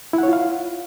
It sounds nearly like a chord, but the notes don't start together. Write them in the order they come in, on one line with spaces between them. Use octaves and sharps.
E4 F#5 C#5 F4 F5